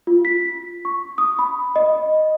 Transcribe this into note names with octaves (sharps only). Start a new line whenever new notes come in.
F4
B6
C#6
D#6
B5
D#5